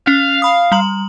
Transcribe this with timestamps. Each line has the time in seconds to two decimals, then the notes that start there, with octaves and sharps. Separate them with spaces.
0.07 C#4 F5
0.42 B5 D#6
0.72 G3 A#5 F#7